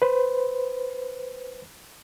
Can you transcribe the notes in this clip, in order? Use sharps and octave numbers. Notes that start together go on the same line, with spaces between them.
B4 C5